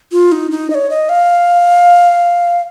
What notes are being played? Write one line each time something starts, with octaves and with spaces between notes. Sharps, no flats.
F4
D#4
D#4
D#5
C#5
D#5
F5